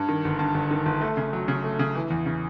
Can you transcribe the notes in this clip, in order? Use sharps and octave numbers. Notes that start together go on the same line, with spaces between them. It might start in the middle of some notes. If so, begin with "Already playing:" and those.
Already playing: G2
D#3
G1
G2
G1
D#3
G1
A3
C#3
F#3
C#3
A3
C#3
E3
E2
C#3